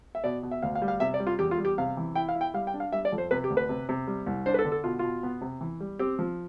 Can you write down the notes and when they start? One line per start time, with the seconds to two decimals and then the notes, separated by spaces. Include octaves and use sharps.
0.15 E5
0.24 B2 D5
0.43 B2
0.51 E5
0.63 D2 F5
0.75 F5
0.82 G3
0.88 F5
1.00 C3 E5
1.14 D5
1.20 G3
1.27 F4
1.39 E2 G4
1.51 F4
1.58 G3
1.65 G4
1.78 C3 F5
1.97 E3
2.15 E4 G5
2.29 F5
2.35 E4
2.41 G5
2.54 G3 F5
2.67 G5
2.74 D4
2.80 F5
2.92 G3 E5
3.05 D5
3.12 F2
3.18 C5
3.31 C3 B4
3.44 G4
3.50 D2
3.57 B4
3.69 C3
3.89 C3
4.07 G3
4.26 C2
4.46 D4 C5
4.54 B4
4.59 A4
4.65 D3
4.72 A4
4.84 B2 F4
4.99 B2 F4
5.23 B3
5.41 C3
5.61 E3
5.80 G3
5.99 C4 G4
6.19 F3